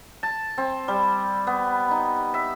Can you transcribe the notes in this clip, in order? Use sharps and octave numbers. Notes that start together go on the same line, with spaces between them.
A5
C4
G3
B3
D#4
E5